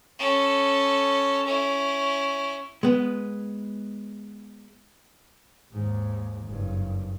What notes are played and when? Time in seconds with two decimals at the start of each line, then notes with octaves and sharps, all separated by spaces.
0.19 C#4 A4
1.46 C#4 E4
2.83 G#3 B3
5.73 D#2 G#2
6.46 F#1 G2